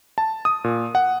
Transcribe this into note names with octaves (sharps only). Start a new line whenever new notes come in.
A5
D#6
A#2
F#5